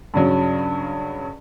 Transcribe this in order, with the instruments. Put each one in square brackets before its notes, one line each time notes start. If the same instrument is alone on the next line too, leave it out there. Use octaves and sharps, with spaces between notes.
[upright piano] G2 C#3 F#3